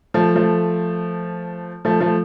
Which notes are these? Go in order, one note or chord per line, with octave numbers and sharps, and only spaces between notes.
F3 A3
F3 A3
F3 A3
F3 A3